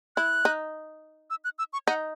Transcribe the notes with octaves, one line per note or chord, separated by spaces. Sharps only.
E4 F#6
D#4
E6
F#6
E6
C#6
D#4 F#5